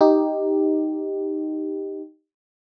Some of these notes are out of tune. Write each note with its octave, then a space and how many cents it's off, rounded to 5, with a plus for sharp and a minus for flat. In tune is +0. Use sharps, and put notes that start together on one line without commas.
D#4 +0 G4 +0